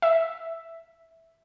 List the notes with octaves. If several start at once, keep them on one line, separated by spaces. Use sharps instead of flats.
E5